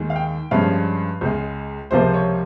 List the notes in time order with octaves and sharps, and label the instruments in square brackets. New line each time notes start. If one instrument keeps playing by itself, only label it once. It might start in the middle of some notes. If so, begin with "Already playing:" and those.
Already playing: [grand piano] D#2 D#3 G#3
F5
G5
G2 F3 G#3 C#4 F5
C#2 C#3 G#3
C#2 C3 F3 A#3 F4 C5
C#5